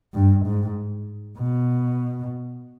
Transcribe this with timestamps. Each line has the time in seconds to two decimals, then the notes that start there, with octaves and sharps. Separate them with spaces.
0.14 G2
0.46 G#2
1.39 B2